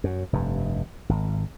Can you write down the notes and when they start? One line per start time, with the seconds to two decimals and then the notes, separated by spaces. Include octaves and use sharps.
0.04 F#2
0.33 F1 G2
1.09 G#1